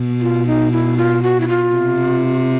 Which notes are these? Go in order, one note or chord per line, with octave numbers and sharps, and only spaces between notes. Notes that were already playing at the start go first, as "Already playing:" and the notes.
Already playing: B2
F4
D#4
E4
F4
F#4
E4
F4
C3